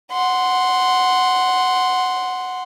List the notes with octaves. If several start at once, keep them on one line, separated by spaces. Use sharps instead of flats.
F#5 C6